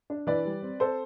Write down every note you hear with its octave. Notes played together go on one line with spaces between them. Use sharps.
D4
E3 B4 D5
G3
C4
C4 A4 C5